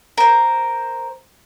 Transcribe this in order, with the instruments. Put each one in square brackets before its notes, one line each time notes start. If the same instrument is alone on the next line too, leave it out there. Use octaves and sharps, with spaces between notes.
[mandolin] A#4 C5